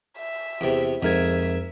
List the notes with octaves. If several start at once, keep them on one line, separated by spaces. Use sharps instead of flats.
E5
E2 C3
F2 G#2 A#4 E5 G#6